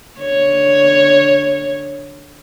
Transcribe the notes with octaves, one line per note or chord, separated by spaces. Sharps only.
D3 C#5